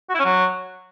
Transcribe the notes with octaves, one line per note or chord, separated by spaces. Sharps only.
F#4
E4
C#4
F#3